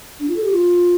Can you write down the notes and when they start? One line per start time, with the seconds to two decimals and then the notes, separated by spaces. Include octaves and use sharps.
0.20 D4
0.28 F4
0.36 A4
0.44 G4
0.53 F4